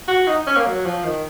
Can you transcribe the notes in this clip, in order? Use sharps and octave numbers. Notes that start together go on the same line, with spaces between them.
F#4
D#4
C#4
A#3
F#3
F3
D#3